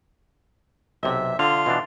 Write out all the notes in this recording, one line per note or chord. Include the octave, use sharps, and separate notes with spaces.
B1 C3 E5
D3 F4
B2 E3 D4